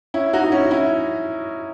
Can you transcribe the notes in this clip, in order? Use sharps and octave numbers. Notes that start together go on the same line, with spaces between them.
C#4 E4
D#4 F#4
F#4
C#4 E4
C#4 E4